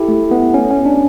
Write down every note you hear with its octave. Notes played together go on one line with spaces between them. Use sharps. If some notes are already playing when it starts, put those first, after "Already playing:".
Already playing: E4 G4 A4
A3
B3
C#4
C#4
D4